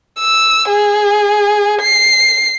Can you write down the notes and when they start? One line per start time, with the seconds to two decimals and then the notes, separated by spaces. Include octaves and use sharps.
0.19 E6
0.69 G#4
1.82 C7